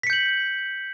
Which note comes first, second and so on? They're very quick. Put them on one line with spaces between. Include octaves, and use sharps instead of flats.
B6 C#7 G6 F#7